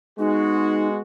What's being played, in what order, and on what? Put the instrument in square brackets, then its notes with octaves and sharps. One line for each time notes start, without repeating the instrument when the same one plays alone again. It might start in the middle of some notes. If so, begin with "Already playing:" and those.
[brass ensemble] G#3 B3 F#4 [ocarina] D#4